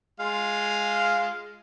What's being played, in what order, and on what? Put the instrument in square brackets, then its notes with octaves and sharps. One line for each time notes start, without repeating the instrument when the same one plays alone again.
[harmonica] G#3 F4 F5